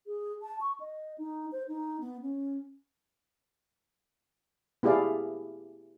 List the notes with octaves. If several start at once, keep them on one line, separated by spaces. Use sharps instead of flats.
G#4
A5
C#6
D#5
D#4
C5
D#4
B3
C#4
B3 E4 G4 G#4 D5 F5